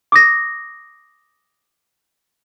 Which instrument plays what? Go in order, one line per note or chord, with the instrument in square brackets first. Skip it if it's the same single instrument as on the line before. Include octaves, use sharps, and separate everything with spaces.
[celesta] D6 D#6 A#6